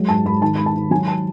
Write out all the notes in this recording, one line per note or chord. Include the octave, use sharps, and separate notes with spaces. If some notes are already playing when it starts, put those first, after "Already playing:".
Already playing: F#3 G#3
G#2 A5
G#2 B5
D#3 A5
G#3 B5
A5
D#3
F#3 G#5
A5